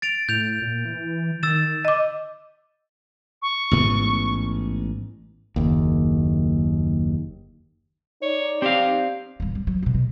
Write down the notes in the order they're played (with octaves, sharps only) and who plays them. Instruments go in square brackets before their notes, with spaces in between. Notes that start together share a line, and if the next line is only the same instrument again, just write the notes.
[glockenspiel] A6 D7 F7
[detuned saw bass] A2 [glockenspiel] G6 F7
[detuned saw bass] A#2
E3
[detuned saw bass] D#3 [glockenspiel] E6 A6 E7
[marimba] D#5 D6
[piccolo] C#6
[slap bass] A1 G#2 B3
[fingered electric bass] F#1 D#2
[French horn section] D#4 D5 [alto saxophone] C#5
[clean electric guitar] C4 F5 [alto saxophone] G4
[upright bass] D1 G3
G3
F#3
B2 F#3
G#3